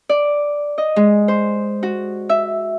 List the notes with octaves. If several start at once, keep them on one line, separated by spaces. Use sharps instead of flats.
D5
D#5
G#3
C5
F#4
E5